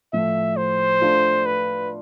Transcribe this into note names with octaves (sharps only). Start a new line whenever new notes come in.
A2 F3 A3 E5
C5
A3 D4 F4
B4